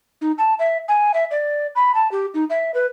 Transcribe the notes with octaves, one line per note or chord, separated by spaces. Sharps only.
D#4
A5
E5
G#5
E5
D5
B5
A5
G4
D#4
E5
B4